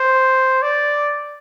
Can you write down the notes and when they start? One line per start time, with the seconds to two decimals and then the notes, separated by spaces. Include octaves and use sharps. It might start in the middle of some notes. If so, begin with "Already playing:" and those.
Already playing: C5
0.62 D5